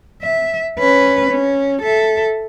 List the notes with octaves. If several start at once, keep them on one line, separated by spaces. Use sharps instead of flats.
E5
C#4 B4
C#4
A4 E5